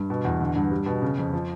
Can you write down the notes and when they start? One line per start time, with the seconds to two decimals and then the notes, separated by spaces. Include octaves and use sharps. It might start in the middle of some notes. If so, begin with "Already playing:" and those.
Already playing: G2
0.10 B2
0.25 E2
0.40 D3
0.56 G2
0.71 G3
0.86 B2
1.02 C#3
1.18 F2
1.33 F3